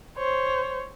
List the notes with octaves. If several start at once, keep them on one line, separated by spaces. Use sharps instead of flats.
C5 C#5